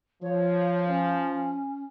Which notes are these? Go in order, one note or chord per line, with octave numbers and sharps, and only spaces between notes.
F3 C#5
C#4